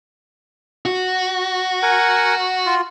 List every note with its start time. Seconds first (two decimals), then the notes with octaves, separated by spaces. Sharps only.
0.86 F#4
1.83 A#4 F#5 G#5
2.66 F4